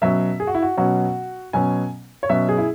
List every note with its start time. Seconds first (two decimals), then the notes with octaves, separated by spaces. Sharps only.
0.02 B2 F#3 C#4 E5
0.40 G#4
0.47 F#4
0.55 E4
0.62 F#4
0.77 B2 F#3 C#4 F#4
1.53 B2 F#3 C#4 G#5
2.23 C#5
2.29 B2 F#3 C#4 E5
2.49 G#4
2.58 E4